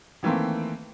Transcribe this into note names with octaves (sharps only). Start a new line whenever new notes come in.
D#3 E3 A3 A#3 C4